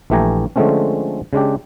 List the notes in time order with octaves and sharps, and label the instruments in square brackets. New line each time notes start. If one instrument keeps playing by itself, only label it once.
[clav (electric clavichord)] A#1 E3 A3 G4 G#5 A#5
D3 F3 G#3 A3 C4 C#4
C#3 G#3 D4 G4